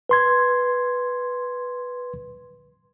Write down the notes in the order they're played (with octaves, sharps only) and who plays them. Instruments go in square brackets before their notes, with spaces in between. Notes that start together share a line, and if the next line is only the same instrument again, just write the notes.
[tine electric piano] B4 C6 G#6